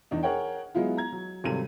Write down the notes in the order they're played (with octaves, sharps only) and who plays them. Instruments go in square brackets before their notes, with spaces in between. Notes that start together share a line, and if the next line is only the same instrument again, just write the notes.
[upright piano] E2 D4 D#4
G#4 A#4 C#5 F#5 G5
F#3 G#3 B3 E4 F4
A#5 G#6
F#3
G#1 C3 F#3 G3 A4 D#7